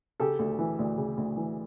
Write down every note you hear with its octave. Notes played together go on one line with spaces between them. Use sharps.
C#3 G4 A4
D2
E3
D2
C#3
D2
E3